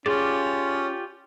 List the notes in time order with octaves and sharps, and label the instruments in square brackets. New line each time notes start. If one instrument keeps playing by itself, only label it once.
[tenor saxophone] C#4 [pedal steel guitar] F4 G4 D5 [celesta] G#4